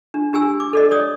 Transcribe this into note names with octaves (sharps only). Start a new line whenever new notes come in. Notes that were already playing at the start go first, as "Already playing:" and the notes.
D4
D4 G4 G#5 E6
D6
A4 D5 D#5
C#5 D5 D#6